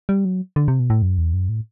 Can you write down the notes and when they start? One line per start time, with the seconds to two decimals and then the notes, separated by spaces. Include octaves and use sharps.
0.09 G3
0.25 F#3
0.56 D3
0.68 C3
0.80 B2
0.90 A2
1.02 F#2
1.18 E2
1.34 F#2
1.49 A2